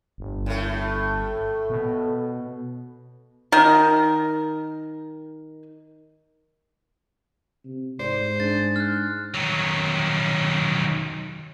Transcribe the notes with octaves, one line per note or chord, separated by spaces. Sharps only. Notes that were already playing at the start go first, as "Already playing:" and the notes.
G1
A2 A3
B2
D#3 A#4
C3
G#2 C5 D5
G#3 D4 A6
F6 F#6
D#3 F#3